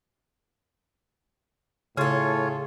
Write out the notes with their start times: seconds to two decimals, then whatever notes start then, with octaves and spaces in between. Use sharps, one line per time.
1.97 A2 C#3 F4 G#4 A4 C#5